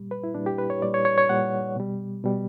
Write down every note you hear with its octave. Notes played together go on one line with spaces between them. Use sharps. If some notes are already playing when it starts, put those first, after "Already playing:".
Already playing: A#2 G3
B4
E4
A#2 G3 D4
G4
B4
C#5
A#2 G3 D5
C#5
C#5
C#5
A#2 G3 F#5
B2 G3
B2 G3